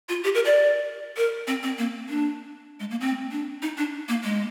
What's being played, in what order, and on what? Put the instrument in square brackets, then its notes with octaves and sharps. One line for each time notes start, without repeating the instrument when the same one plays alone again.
[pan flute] F4
G4
A#4
D5
A#4
C4
C4
A#3
D4
G#3
A#3
C4
D4
D#4
D4
A#3
G#3